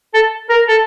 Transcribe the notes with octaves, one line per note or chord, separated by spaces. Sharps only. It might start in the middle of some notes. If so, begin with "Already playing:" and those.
A4
A#4
A4